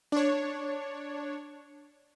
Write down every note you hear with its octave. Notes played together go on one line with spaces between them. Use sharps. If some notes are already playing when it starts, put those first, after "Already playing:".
D4 C#5